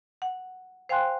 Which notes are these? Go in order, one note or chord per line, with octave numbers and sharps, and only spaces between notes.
F#5
C5 F5 G5 G#5 C6 F#6